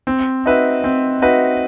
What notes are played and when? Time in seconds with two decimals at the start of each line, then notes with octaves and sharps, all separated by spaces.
0.07 C4
0.46 D#4 F#4 B4 E5
0.84 C4
1.22 D#4 F#4 B4 E5